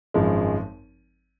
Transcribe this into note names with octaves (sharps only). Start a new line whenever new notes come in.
G#1 F#2 F3 G#3